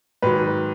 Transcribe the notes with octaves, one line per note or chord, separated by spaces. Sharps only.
G#2 D#3 F#3 B4